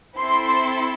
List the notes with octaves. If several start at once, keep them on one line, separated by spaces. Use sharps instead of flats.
C4 E4 A4 C6